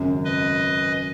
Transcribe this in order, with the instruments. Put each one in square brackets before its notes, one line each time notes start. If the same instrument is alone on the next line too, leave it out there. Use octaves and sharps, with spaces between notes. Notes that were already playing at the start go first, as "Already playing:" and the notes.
Already playing: [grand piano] G#1 F#2 C#3
[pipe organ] B4 D#5